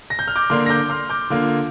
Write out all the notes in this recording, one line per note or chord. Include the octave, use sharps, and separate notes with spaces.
A#6
G6
F6
D6 G6
D3 A#3 D4 C6 F6
A#6
D6 G6
C6 F6
D6 G6
D3 A#3 F4